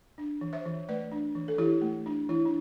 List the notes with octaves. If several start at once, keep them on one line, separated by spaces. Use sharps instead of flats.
D4
E3
C5 E5
E3
A3 B4 D5
D4
E3
A4
E3 E4 G4
A3
D4
E3 E4
D4